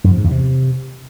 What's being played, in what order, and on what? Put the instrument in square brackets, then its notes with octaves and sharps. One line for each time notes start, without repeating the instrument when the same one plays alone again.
[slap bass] F#2
F3
G#2
E2
C3